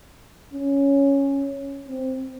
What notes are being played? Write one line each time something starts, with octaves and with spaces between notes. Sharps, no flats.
C#4
C4